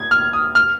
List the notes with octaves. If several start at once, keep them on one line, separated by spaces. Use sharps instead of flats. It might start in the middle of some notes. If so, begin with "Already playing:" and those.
Already playing: G#6
F6
D#6
F6